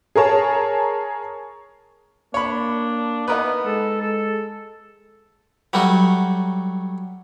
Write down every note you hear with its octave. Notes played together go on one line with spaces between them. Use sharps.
G#4 A#4 C#5 A5
A#3 D4 C#5 B5
B3 D#4 A#4 B4
G#3 A4
A4
F#3 G3 A3 F#4